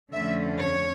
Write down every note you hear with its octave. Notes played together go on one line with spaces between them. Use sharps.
F2 D3 A3 C#4 E5
C#5